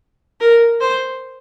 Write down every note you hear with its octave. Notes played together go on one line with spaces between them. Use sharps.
A#4
C5